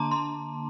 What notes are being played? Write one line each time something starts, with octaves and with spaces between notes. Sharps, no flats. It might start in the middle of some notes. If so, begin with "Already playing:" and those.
Already playing: D3 A#3 D4 A5 A#5 C6 D6
C6